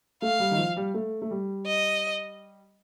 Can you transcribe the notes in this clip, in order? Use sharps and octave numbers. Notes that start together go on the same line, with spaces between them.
A3 F5
G3
D#3
F3
G3
A3
A3
G3
D#5